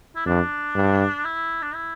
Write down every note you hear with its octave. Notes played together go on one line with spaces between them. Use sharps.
E4
F2 D4
G2
E4
D4
E4